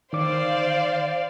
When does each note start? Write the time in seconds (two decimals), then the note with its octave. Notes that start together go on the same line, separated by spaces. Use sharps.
0.13 D#3 C5 D5 F5 D6